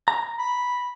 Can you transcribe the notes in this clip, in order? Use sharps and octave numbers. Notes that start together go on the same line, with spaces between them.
A#5
B5